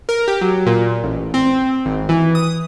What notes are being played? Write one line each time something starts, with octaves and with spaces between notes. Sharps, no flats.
A#4
G4
F#3
A#2
A1
C4
G#1
E3
D#6